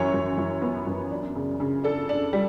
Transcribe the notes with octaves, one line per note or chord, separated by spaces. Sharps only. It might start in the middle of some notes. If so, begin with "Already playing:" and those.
Already playing: F#2 E3 C#5
F#2
F#2
B3
F#2
D4
C#3
C#3
D4 A4
D4
G3